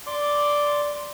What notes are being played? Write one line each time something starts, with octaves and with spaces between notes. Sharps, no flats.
D5 C6 D6